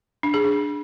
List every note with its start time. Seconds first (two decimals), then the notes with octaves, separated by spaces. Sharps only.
0.23 D4
0.34 G#4
0.44 D4